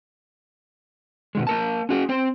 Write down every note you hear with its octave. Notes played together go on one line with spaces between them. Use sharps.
B2 D#3 G#3
A#3 A#4 A5
C#4 F#4 G#4
C4 C5